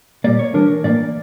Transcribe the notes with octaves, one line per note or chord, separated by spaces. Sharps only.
A#2 G3 A#3 D5
C#5
E3 G3 D4 A#4
A2 E3 A#3 D5